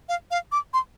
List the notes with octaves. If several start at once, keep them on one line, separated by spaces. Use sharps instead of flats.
F5
F5
D6
C6